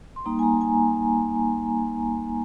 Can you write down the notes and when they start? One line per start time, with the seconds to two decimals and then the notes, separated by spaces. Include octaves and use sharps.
0.16 C6
0.25 G3 A#3 D#4 A#5
0.39 G#5
0.43 A#5
0.61 G#5